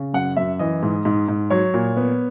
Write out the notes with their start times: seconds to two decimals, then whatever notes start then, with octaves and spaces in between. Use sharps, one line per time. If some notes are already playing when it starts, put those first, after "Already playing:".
Already playing: C#3
0.14 F#2 F#5
0.37 F#2 E5
0.59 E3 D#5
0.83 G#2
1.05 G#2
1.28 G#2
1.50 F#3 C#5
1.74 A#2
1.97 B3